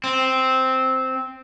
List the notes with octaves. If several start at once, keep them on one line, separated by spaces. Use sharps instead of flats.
C4